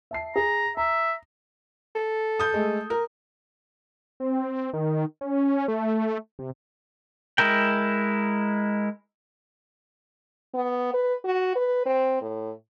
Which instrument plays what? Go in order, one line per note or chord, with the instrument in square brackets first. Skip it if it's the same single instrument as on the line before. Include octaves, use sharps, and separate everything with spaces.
[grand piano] E5 A5 C7
[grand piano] G#4 [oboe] A#5
[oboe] E5 [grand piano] A#5
[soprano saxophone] A4
[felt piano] D#6 G6
G#3 A3
A#4
[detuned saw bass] C4
D#3
C#4
A3
C3
[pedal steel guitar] G#3 E4 A#4 G5
[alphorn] B3
B4
F#4
B4
C4
A2